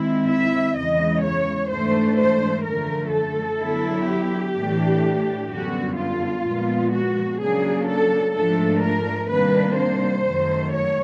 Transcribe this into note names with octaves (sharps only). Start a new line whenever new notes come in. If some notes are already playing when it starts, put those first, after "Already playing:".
Already playing: D#3 G#3 C4 E4
E5
E2 C#3 E3 G#3 D#5
C#5
G#2 E3 A3 D4 C5
C5
F#2 D3 F3 A3 A#4
A4
D3 F#3 B3 E4
G4
A2 E3 A3 D4
F#2 D3 G3 B3 F#4
F4
A#2 F3 G#3 B3
F#4
C#3 F#3 A#3 D4 G#4
A4
G#2 F3 A3 D4 A4
A#4
C3 D#3 G3 A#3 D4 B4
C5
F#2 D#3 F#3 A3
C#5